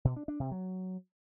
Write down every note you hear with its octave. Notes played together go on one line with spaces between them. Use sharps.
B2
D4
D4
C3
F#3